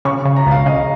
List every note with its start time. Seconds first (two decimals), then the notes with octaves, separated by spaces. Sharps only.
0.05 C#3 C#6
0.25 C#3
0.36 A#5
0.47 C#2 F5
0.66 C#3 D#5